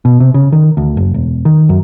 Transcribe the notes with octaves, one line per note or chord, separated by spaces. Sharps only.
B2
C3
C#3
D#3
D2
F#1
E1
D#3
F#2